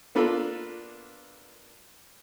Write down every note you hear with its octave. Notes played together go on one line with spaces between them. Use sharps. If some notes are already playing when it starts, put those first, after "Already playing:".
A#3 B3 D4 F4 A4